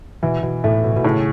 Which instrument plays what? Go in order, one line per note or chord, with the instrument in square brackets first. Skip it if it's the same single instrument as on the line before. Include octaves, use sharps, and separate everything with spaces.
[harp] B2 [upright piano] E3
[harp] B2
[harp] A2 [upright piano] A3
[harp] B2
B2
[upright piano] A2 [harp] C#3